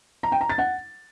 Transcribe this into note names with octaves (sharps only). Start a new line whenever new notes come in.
A#5
G5
A#5
A6
F#5